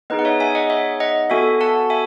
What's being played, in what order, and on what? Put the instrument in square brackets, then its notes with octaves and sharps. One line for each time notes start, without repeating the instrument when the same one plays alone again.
[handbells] B3 D#4 G#4 B4 D#5
F#5
C#5 E5
E5 G#5
D#5 F#5
C#5 E5
D#5 F#5
B3 F#4 A4 E5 G#5
F#5 A5
E5 G#5